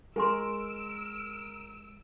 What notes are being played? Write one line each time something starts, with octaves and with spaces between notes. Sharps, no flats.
G#3 F4 A#4 G#5 C6 E6 D7